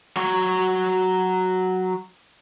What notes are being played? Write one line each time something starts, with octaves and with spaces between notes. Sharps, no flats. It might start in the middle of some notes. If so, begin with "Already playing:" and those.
F#3 C#5